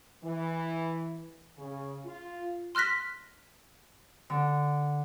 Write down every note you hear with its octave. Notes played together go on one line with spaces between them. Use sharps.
E3
C#3
F4
C6 F6 F#6 A#6 B6
D3